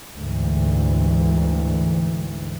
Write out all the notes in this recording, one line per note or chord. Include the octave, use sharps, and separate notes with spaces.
D2 G#2 E3